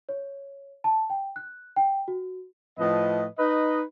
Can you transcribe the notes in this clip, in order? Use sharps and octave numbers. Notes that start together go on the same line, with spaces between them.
C#5
A5
G5
F#6
G5
F#4
A2 F3 B4 D#5
D#4 B4 D#5